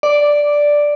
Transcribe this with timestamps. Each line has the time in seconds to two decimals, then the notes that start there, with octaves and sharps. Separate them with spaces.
0.03 D5